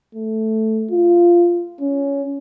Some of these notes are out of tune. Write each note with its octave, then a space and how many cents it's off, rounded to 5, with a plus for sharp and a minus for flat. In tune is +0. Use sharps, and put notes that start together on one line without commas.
A3 +0
F4 -10
C#4 +15